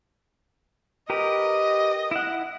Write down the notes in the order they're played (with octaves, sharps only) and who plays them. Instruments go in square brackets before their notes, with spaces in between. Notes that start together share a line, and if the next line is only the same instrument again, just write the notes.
[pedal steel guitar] G4 A#4 B4 [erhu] D#5
[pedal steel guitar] E4 F#5